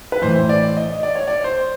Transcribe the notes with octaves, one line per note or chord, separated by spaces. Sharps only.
B4
A2 E3 C5
D5
D#5
D5
C#5
D5
C5